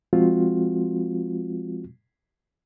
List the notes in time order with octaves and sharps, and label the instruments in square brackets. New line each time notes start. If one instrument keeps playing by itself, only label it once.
[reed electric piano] F3 G#3 C4 F4 F#4